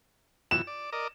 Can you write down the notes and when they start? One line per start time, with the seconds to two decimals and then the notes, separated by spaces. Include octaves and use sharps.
0.51 B2 E3 F#3 E7
0.67 D5
0.92 A#4 D5 D#5